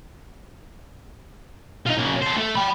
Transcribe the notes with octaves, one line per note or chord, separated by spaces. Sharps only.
D#4 F4
C#3 A#3
A4 C5
A3
G5 B5